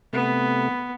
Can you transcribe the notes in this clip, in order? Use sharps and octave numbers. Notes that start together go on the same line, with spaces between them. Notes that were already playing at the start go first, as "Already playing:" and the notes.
C3 A3 B3